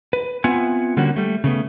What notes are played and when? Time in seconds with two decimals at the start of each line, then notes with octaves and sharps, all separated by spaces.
0.13 B4
0.44 B3 C4 F4 E5 F#5 G#5
0.97 D3 G3 A#3 C#4 F#4
1.16 G3 A3
1.44 C#3 A3 B3